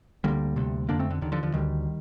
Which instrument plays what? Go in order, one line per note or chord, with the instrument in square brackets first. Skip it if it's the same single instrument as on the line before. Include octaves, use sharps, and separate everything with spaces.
[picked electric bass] D2 D3 G3 A#3
D2 C3
F2 D3 A#3 D4
A3 C4
D3
D#2 D3 D#3
D3 F3
D3 F3
D2 D3 D#3 G3